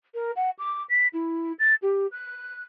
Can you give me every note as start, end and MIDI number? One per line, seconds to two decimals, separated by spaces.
0.14 0.31 70
0.36 0.50 78
0.59 0.83 86
0.90 1.07 95
1.13 1.53 64
1.59 1.74 93
1.82 2.07 67
2.12 2.63 90